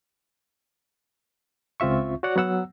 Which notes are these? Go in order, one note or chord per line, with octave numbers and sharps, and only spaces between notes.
C#2 C4 F4 E5 C#6
F#4 C#5 D5 F#5
F#3 B3 F#5 E6